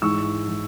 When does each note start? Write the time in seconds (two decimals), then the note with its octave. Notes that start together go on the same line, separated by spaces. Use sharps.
0.01 G#2 E3 G#3 C#6 E6
0.47 E3 G#3